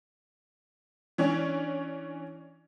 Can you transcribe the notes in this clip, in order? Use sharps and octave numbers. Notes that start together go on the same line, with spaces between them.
E3 C#4 D4